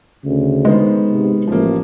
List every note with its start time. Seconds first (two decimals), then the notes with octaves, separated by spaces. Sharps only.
0.24 D2 C#3
0.65 D#3 G#3 B3 C5
1.11 G#2 C3
1.47 A1 F3 A#3